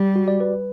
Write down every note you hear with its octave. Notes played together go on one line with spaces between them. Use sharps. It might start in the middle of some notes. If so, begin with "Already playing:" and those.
Already playing: G3 G4
F#4
D5
B4